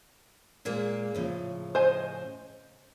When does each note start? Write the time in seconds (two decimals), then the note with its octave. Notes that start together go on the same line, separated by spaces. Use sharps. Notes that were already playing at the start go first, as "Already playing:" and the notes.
0.65 A#2 G#3 A#3
1.15 A2 C#3 F3
1.75 C5 D#5 G#5